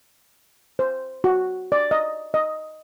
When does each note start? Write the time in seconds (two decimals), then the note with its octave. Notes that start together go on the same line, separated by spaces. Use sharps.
0.79 C5
1.24 F#4
1.72 D5
1.91 D#5
2.34 D#5